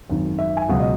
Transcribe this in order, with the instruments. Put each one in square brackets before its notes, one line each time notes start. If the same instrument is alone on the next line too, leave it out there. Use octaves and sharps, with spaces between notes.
[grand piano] G#1 F#2 D#3
E5
G#5
C#2 B2 F#3 F#5
D#5